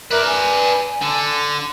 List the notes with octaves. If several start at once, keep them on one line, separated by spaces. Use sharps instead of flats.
A#4 B4 D5 E5 F#6
G#5
D3